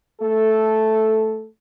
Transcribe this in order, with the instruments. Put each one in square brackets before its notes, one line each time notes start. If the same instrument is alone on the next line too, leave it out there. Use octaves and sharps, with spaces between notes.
[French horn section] A3 A4